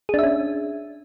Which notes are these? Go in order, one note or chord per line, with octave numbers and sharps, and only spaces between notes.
C#4 D4 G#4 E5